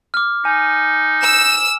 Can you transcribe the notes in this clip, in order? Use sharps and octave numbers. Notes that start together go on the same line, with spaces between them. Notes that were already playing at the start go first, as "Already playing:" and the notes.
D6 F6
D#4 G#5
E6 E7